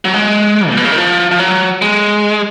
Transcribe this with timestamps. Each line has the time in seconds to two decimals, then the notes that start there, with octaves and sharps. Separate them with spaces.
0.05 F#3
0.14 G#3
0.70 A#2
0.77 B2
0.84 C#3
0.92 D#3
0.98 F3
1.31 F3
1.40 F#3
1.82 G#3